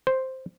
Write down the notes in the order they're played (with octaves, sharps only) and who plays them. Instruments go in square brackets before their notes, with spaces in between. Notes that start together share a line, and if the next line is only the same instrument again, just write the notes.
[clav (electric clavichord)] C5